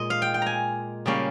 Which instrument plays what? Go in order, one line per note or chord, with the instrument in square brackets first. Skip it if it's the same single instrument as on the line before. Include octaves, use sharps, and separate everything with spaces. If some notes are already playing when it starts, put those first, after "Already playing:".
Already playing: [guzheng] A#2 G#3 D#5
F5
G5
G5
G#5 A#5
C#3 G3 A#3 C#4